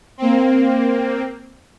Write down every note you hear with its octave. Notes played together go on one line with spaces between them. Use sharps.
A#3 C4